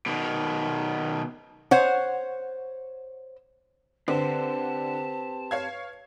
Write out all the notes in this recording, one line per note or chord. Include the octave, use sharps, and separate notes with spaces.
B2 D#3
C5 C#5 F#5
D3 C4 G4 B4 C5 A5
C#5 F5 G#6